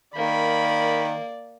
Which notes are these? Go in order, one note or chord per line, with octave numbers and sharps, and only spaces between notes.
D#3 A#3 D5 B5